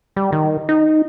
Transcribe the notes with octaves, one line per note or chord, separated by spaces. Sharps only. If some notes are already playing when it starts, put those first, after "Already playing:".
G3
D#3
D#4